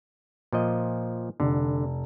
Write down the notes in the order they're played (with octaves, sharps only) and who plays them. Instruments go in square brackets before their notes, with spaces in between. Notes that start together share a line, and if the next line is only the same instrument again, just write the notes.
[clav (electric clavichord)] A#2 F3 D#5
[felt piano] F1 [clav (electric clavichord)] D3